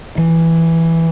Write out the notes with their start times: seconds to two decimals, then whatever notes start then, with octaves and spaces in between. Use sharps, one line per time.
0.18 E3